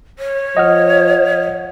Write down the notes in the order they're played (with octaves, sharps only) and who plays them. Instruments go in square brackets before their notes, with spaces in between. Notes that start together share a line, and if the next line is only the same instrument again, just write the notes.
[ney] C#5
[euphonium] F3 [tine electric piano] D#5 F#5 F6